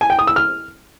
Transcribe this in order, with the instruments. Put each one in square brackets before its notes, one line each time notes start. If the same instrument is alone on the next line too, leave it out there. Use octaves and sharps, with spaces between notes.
[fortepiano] G#5
G5
D#6
E6
F6